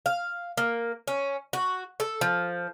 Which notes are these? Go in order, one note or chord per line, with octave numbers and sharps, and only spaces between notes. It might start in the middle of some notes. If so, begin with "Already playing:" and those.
F5
A#3
C#4
F#4
A4
F3